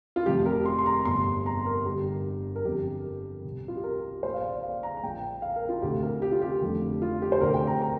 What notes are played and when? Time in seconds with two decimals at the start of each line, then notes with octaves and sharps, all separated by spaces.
0.16 F4
0.26 F1 F2 C3 G4
0.41 G4
0.46 A#4
0.66 C6
0.79 C6
0.86 A#5
1.05 G1 F2 C3 C6
1.46 A#5
1.66 A#4
1.85 G1 G2 D3 G4
2.56 A#4
2.65 G1 F2 D3 G4
3.44 C2 C3
3.68 F4
3.77 G4
3.84 A#4
4.23 A#1 A#2 C5
4.34 F5
4.43 D5
4.63 F5
4.83 A#5
4.97 A#5
5.03 A#1 A#2 G5
5.42 F5
5.56 A#4
5.69 F4
5.82 D2 C3 G4
6.03 A#4
6.22 G4
6.31 F4
6.42 G4
6.61 F1 F2 D3
7.02 F4
7.22 G4
7.32 C5
7.41 D2 C3 A#4
7.54 G5
7.67 A#5
7.82 A#5